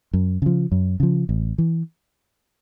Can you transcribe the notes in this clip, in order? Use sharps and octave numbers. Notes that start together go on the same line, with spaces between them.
F#2
C#3 F3
F#2
C#3 F3
A1
E3